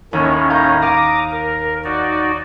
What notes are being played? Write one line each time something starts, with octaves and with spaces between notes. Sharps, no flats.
D#2 A2 D#3 C#4
F5 A#5 G6
F5 A#5 D6 D#6
A#4
D#4 F#4 D5